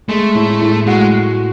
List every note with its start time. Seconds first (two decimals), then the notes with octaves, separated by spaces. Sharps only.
0.09 G#3 A3
0.35 A2
0.61 A2
0.87 G#3 F#4